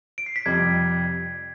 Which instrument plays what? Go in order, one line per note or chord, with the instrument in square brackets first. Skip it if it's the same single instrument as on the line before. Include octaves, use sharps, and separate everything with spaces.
[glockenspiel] D7
C7
B6
[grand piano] F2 C3 G3 [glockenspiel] G#6